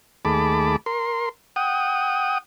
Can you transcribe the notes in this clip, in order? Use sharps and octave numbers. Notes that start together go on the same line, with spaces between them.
D#2 A3 G#4 A5 B5 D6
A#4 C6
F#5 G5 D#6